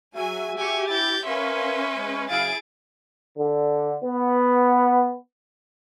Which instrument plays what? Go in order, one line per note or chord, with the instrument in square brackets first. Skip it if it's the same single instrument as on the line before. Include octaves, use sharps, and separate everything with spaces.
[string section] F#3 G#5 [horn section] F#4 G#4 E5
[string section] G4 [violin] G#5 C#6
[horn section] E4 [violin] G6 A6
[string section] C#4 B4 [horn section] A#4 F5 [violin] E5 C6
[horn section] G#3
[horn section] C#3 F#3 F5 [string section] E4 G#4 [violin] A6 D7
[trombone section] D3
B3